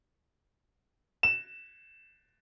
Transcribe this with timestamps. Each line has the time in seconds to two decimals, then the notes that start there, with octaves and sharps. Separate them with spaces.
1.23 E7